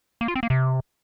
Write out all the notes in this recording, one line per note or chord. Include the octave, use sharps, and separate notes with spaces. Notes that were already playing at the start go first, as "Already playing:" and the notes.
A#3
F4
C4
A#3
C3